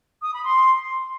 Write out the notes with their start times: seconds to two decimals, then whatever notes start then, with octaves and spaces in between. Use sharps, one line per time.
0.21 D#6
0.33 B5
0.44 C6